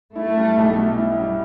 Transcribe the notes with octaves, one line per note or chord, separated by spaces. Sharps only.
A3 E4
G3
B1
B2
E4
G3